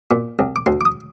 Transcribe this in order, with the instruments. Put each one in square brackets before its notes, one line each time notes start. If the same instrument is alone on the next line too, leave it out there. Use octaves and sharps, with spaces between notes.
[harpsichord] A#2
C2
D6
D2 C6
D6
D#6